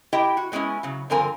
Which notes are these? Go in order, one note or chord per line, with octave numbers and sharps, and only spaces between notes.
E4 G4 D#5 G5
F#4
F#3 G#3 B3 C#4 E4
C#3 F#3
G2 D3 F3 C4 A#4 G#5